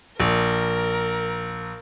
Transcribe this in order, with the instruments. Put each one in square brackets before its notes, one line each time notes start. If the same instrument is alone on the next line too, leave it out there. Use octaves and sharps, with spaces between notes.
[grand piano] A#1 [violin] A#4